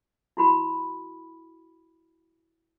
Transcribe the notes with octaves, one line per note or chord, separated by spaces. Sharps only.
E4 F#4 B5